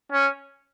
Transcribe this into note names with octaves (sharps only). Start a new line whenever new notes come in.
C#4